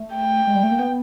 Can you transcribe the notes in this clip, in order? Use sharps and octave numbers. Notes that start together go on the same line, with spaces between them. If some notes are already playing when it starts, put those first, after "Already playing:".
Already playing: A3
G5
G#3
G3
A3
A#3
B3